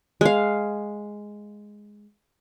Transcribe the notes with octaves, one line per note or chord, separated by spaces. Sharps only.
G#3 F5